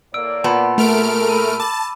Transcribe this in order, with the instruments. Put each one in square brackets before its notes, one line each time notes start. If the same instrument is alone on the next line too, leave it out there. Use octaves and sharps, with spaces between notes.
[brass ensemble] A2 A#3 D5 [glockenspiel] E6 D7
[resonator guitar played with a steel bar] A#2 B3 [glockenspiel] A5 B5
[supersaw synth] A3 F6 D7 [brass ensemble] G#4 A#4
[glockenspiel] B5 E6 D#7
[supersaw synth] A5 [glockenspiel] B5 D6